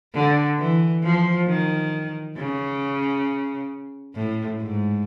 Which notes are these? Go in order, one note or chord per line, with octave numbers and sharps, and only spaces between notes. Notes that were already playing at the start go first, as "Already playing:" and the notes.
D3
E3
F3
D#3
C#3
A2
G#2